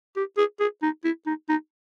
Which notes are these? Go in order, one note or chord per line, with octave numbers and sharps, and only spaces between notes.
G4
G#4
G#4
D#4
E4
D#4
D#4